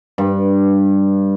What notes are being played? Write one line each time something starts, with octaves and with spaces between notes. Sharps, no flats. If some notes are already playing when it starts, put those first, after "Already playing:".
G2